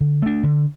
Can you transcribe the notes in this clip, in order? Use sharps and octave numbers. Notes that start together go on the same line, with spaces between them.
D3
A3 D4
D3